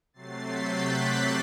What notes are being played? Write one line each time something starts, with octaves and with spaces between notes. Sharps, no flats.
C3 F#3 A3 A6 C7
G6 B6
F#6 A6
D6 F#6